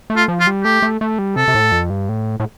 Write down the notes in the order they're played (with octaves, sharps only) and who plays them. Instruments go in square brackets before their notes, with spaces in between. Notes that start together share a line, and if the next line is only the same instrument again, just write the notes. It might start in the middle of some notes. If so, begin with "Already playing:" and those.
[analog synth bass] A3
[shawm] F4
[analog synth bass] F3
[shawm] F4
[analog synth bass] G3
[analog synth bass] A3 [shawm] G4
[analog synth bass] A3
A3
G3
[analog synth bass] C3 [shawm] A4
[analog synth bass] C3
A2
F2
G2
A2
A2